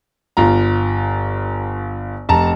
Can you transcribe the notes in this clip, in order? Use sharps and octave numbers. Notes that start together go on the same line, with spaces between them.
G1 F4 A#5
F1 A5 A#5